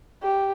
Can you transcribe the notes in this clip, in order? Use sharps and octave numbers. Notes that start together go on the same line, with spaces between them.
G4